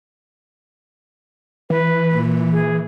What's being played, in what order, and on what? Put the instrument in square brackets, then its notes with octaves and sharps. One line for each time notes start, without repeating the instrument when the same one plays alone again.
[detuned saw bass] E3 [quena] B4
[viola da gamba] A#2
[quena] G#4